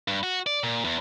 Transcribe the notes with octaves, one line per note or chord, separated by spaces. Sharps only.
G2
F#4
D5
A#2
E2